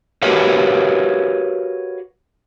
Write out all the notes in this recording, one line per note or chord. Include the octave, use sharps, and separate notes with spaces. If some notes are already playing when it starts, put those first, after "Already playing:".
F#4 G4 A#4 B4 C#5 F5